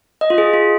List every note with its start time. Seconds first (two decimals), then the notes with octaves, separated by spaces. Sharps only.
0.21 D#5
0.30 F4
0.38 G#4
0.53 F4